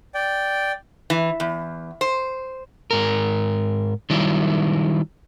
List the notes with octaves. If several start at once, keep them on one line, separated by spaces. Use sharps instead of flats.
D5 G5
E3
E2
C5
G#2 A#4
D#3 F#3 G3 E4